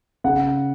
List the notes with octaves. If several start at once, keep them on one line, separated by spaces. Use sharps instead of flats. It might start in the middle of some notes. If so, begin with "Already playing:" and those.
C#3 F#5